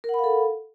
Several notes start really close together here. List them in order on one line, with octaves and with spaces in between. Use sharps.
A#4 F#5 B5 F5 A4